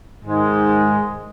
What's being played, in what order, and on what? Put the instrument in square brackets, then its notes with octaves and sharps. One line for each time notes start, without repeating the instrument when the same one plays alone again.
[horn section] G#2 D#3 G#3